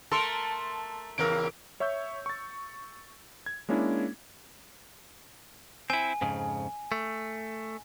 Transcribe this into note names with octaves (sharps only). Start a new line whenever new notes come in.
A3 A4 A#4 A5 C6
E2 C#3 E3 A#4 D7
C#5 E5 C#6 E6 G6
C#6 A6
G#6
G#3 A#3 C#4 D4 E4
C4 E4 G#5
F2 G#2 C#3
A3